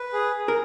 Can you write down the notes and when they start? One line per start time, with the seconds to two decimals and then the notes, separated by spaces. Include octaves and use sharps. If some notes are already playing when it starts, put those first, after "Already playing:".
Already playing: B4
0.13 G#4
0.36 G#4
0.48 A#4